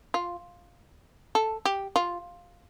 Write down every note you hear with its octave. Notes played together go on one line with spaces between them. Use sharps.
F4
A4
G4
F4